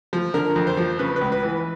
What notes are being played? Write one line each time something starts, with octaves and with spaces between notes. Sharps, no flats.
F3
D3 A#4
F2
C5
F3
C#3 B4
B4
C#2
B4
E3
B4